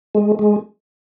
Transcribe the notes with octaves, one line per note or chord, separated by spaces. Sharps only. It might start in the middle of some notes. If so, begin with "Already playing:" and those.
G#3
G#3